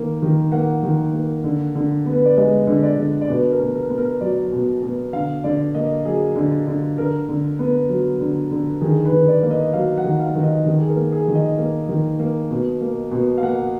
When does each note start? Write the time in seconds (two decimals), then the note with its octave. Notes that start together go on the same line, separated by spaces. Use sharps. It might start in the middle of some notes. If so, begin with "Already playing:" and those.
Already playing: D#3 A#3
0.22 D#3
0.52 A#3 F#5
0.83 D#3
1.13 A#3
1.44 D3
1.75 D3
2.06 B3
2.13 B4
2.25 D5
2.37 G#3 D#5
2.67 D3
2.83 D5
2.97 D3
3.21 D5
3.28 B2 B4
3.52 A#4
3.59 B2
3.75 A#4
3.90 B3
3.98 A#4
4.21 F#3 D5
4.52 B2
4.82 B2
5.13 D3 F5
5.44 D3 D5
5.75 A#3 D#5
6.05 F#3 G#4
6.36 D3
6.67 D3
6.98 D3 A#4
7.29 D3
7.59 B3
7.89 F#3
8.20 D3
8.51 D3
8.81 D#3 G#4
9.05 B4
9.12 D#3
9.28 D5
9.43 A#3
9.51 D#5
9.74 F#3 F5
9.98 F#5
10.04 D#3
10.19 F5
10.35 D#3
10.43 D#5
10.66 D#3
10.78 G#4
10.89 A#4
10.96 A#3
11.12 G#4
11.28 D#3
11.35 D#5
11.58 A#3
11.89 D#3
12.19 A#3
12.51 B2
12.81 A#3
13.11 B2
13.38 F5
13.42 A#3 F#5